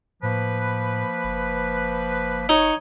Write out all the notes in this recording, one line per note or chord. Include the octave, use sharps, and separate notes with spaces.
A2 F3 A#3 B4
F#1
D#4 C#5